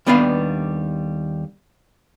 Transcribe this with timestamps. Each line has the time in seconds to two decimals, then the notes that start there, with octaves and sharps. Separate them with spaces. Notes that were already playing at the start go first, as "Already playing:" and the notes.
0.06 D#2 G3 B3 D4 B4 F5